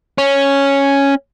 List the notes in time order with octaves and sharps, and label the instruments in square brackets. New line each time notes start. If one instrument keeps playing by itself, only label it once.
[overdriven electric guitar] C#4